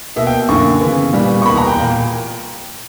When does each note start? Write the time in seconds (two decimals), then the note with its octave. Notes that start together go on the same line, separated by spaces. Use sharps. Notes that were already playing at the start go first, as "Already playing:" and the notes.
0.16 B2 A#3 E5
0.27 G5
0.49 F#2 D3 A#3 C#6
0.81 C#3 E3 B3
1.13 A#2 G3 B3
1.42 C#6
1.46 E2 B2 A#3 B5
1.57 A#5
1.67 G5
1.78 A#2 A#3